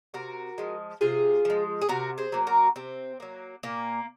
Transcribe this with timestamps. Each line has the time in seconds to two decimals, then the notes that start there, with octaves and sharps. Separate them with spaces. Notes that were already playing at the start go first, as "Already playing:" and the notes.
0.14 C3 F#4 A#4
0.58 F3 G#3
1.01 C3 F4 G#4
1.45 F3 G#3
1.82 G#4
1.89 C3 F#4 A#4
2.18 G#4 C5
2.32 F#3 A#3
2.47 F#4 A#4
2.76 C3 C4
3.20 F#3 A#3
3.63 A#2 A#3